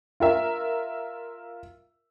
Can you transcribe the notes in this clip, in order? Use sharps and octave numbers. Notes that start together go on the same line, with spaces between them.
F4 A#4 E5